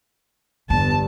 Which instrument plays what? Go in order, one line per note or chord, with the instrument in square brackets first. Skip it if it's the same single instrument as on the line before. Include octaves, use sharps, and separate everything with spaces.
[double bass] G1 G2 [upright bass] E2 [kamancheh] A5